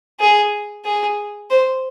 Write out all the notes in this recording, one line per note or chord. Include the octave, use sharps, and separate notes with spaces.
G#4
G#4
C5